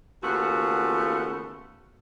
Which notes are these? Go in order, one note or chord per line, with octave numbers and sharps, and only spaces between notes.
D#2 C#3 A3 B3 F4 F#4